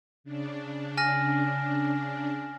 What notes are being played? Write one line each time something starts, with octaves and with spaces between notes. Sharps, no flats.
C#3 D4
G#5 F6 A#6